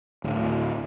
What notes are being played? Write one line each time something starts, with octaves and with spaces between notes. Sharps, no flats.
D1